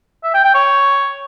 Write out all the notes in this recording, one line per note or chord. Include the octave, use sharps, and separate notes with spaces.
E5
G5
G5
C#5